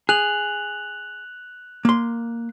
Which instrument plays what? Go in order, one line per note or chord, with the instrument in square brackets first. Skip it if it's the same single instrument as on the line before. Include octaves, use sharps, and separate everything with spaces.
[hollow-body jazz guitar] G#4 [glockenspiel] F#6 F7 F#7
[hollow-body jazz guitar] A#3 C6